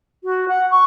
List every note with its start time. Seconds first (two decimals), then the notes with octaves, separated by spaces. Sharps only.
0.24 F#4
0.48 F#5
0.71 C#6